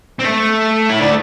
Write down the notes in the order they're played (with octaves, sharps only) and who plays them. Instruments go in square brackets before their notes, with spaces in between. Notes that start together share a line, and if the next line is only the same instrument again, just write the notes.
[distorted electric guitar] C4
A3
E4
D4